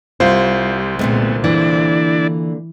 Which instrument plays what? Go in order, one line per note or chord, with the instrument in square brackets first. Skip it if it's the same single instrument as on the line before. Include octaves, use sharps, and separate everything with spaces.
[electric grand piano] C2 C5 [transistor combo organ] G3 [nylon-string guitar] F4
[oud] A#2 D3 G#3 [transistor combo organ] A3 B3 [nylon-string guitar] C4
[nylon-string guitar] E3 [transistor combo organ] D4 E4 D5